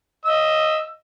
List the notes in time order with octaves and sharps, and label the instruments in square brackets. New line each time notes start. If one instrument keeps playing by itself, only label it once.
[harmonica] D#5 E6